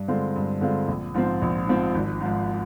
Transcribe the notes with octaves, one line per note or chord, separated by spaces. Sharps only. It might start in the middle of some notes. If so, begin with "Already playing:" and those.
Already playing: G2
D3 G#3 C4 F4
G2
D3 G#3 C4 F4
A#1
G#2 F3 C4
A#1
G#2 F3 C4
G#1
G#2 F3